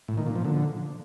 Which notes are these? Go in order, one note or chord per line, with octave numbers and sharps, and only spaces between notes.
A2
D#3
A#2
F3
D3